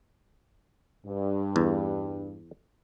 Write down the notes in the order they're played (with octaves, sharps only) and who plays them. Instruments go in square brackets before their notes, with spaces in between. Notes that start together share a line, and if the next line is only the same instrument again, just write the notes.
[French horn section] G2
[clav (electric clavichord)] E2